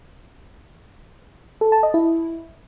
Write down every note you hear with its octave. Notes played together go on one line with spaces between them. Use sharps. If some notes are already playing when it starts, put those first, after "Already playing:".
A4
A5
D#5
E4